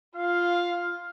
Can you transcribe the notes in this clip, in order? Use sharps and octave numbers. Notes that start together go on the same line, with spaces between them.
F4 F5